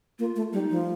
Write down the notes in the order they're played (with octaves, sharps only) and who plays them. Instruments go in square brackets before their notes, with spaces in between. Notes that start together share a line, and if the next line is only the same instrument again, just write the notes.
[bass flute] A#3 [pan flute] F4
[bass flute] A3
[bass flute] G3 [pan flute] D#4
[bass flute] F3